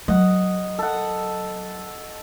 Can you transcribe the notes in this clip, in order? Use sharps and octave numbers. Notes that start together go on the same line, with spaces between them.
F#3 D#5 F#5
A4 F#5